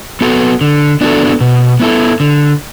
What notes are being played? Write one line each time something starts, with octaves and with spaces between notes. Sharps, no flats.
B3 F#4 A4
D3
B3 D4 F#4 A4
B2
B3 E4 A4
D3